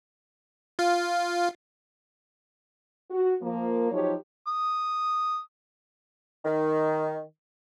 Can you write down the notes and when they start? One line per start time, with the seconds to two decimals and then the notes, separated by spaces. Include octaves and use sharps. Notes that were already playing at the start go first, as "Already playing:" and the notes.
0.79 F4 F5
3.11 F#4
3.42 F3 A#3
3.91 F3 F#3 D#4 G4 C#5
4.47 D#6
6.45 D#3